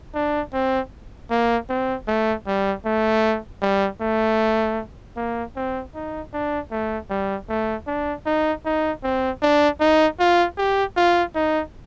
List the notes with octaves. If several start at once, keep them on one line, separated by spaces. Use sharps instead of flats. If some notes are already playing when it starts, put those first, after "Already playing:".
D4
C4
A#3
C4
A3
G3
A3
G3
A3
A#3
C4
D#4
D4
A3
G3
A3
D4
D#4
D#4
C4
D4
D#4
F4
G4
F4
D#4